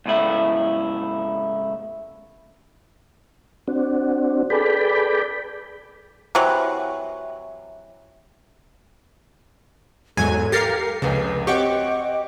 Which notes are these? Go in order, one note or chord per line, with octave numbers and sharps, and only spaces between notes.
C#2 A2 E4
C4 D4 F#4
G#4 A4 B4 D5 G5 B5
C3 E3 F#3
E2 G#2 F#3 A4 G#5
G4 A#4 F5 A6 A#6 C7 C#7
F1 C#2 C#3 B4
C4 F#4 G4 C#5 D#5 C#6 D6